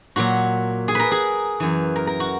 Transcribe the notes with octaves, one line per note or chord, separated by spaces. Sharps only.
A#2 F#3 F#4
G#4
A#4 B4
G#4
F#2 E3
A#4
A#4
F#4